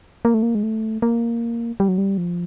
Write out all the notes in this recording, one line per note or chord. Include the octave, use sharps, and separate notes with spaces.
A#3
A3
A#3
G#3
A3
A#3
G3
F#3
G3
F3